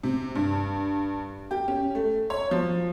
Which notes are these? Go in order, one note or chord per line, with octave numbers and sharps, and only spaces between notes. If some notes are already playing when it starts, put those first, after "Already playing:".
C3
G2
G4
C#4
A3
C#5
F3